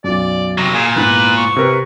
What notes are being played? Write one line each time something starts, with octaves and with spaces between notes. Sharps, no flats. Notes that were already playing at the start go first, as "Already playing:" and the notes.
B1 F#2 D5
C3 F#3 A#6
A#2 G#4
E2 G#2 E3 B4
C#6
C3 A#4 B4